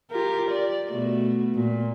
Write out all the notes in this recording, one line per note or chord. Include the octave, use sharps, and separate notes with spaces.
F4 G4 A#4
D5
B2 A3 F#4
A#2